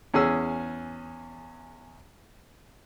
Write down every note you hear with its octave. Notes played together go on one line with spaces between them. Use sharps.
E2 C#4 G#4 E6